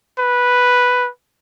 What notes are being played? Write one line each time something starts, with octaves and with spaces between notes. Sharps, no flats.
B4